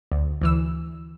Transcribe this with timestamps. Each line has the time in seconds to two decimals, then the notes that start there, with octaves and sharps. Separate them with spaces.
0.12 D2
0.42 D2 E3 E6